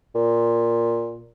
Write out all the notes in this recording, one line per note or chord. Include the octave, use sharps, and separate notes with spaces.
A#2